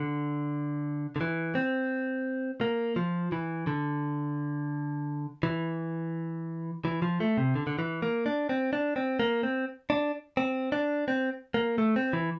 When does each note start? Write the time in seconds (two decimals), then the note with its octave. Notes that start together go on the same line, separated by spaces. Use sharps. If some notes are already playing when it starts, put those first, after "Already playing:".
Already playing: D3
1.16 D3
1.21 E3
1.55 C4
2.61 A#3
2.96 F3
3.32 E3
3.67 D3
5.43 E3
6.85 E3
7.02 F3
7.20 A3
7.37 C3
7.55 D3
7.67 D3
7.79 E3
8.02 A#3
8.26 D4
8.49 C4
8.73 D4
8.96 C4
9.19 A#3
9.43 C4
9.90 D4
10.37 C4
10.72 D4
11.08 C4
11.54 A#3
11.78 A3
11.96 C4
12.13 E3